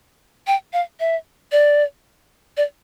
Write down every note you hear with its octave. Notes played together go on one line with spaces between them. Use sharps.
G5
F5
E5
D5
D5